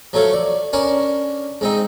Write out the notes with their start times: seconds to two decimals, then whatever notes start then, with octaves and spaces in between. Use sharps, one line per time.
0.13 F3 F#3 A3 C#5 F5
0.33 D5
0.73 C#4 D4 A#4 D5
1.61 G#2 C4 D#4